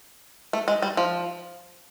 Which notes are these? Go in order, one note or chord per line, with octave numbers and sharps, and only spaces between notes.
A3
G#3
G3
F3